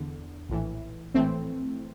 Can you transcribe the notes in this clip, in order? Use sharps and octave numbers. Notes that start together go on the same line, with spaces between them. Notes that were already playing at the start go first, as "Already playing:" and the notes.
Already playing: E2 D3
A#1 A2 E3
A#1 A2 E3 A3 C4